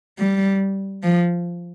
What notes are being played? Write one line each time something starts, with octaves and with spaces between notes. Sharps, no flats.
G3
F3